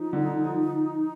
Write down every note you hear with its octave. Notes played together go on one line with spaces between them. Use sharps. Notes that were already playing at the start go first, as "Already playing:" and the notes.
Already playing: F3 D#4
D3
F3